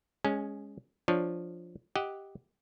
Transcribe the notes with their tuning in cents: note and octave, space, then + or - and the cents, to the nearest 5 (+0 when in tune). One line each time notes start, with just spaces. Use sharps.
G#3 -10 C#4 +0 G#4 +35
F3 +0 D4 +0 C#5 +0
G4 +0 D#5 +15 F#5 +0